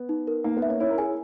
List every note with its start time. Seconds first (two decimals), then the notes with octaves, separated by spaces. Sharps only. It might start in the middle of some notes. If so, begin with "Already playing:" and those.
Already playing: B3
0.09 D#4
0.27 A#4
0.44 A#3 D#4
0.57 B3
0.62 E5
0.68 A#3 C#4
0.80 C#4 E4 C#5
0.90 A#4
0.98 E4 G#4 G#5